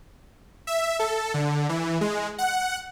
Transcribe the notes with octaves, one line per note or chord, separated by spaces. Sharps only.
E5
A4
D3
E3
G#3
F#5